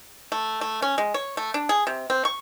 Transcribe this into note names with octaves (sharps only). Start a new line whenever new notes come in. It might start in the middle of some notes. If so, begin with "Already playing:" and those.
A3
A3
C#4
G#3
C#5
A3
D4
G#4
C3
C4
C#6